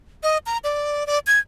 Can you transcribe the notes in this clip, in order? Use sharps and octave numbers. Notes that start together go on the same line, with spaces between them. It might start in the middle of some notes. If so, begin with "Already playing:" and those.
D#5
A#5
D5
D5
G#6